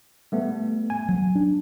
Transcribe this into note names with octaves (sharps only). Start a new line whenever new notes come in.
G3 A3 B3
G#5
F#3
D4